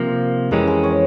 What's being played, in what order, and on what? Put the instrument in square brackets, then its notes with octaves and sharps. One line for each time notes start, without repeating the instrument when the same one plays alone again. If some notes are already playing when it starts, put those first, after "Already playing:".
Already playing: [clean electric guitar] C3 F3 A#3 [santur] C5
[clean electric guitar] F2 E3 G#3 C#4 [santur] G4 A#4
[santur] G#4 C5
A#4 C#5